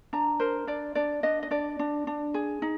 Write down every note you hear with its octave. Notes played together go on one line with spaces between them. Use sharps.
D4 A#5
A#4 C5
D4 D5
D4 D5
D4 D#5
D#5
D4 D5
D4
D4
G#4
D#4